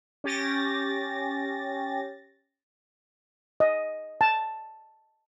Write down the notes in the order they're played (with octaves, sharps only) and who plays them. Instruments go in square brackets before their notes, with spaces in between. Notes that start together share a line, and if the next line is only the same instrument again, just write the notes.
[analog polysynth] C#4 G4 A6 A#6
[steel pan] D#5
A5